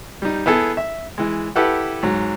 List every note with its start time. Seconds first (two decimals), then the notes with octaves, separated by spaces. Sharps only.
0.22 G3 D#4
0.46 B3 E4 G#4 A4
0.77 E5
1.18 E3 G#3
1.56 E4 G4 A4 B4 F#5
2.03 G#2 F#3